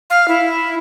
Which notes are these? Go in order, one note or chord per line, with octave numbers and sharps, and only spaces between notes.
F5
E4